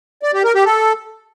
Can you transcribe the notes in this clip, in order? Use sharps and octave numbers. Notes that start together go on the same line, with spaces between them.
D5
G4
A#4
G4
A4